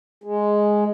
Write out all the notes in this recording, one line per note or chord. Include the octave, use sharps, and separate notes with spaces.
G#3